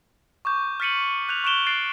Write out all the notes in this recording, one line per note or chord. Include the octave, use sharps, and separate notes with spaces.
C#6 D6 G6
F6 A6 B6 C#7 D#7 F#7
F#6 G6 F7
C#6 F#6 D7 E7 G7
F#6 A6 C7 D7